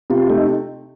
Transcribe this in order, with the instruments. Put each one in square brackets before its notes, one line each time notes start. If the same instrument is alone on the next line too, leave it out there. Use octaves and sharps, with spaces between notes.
[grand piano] C3 [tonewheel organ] F4
[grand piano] A3 [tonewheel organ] D#4